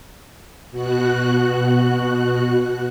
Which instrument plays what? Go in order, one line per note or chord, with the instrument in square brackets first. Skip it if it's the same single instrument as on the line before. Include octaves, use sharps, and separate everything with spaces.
[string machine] B2 F#4 F#6